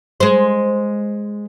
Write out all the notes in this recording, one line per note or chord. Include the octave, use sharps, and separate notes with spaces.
G#3 C5